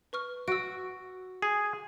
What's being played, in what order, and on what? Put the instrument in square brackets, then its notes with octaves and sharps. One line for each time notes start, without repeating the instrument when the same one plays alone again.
[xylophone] B4 C#6 F6
[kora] F#4 [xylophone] E6 D7
[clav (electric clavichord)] G#4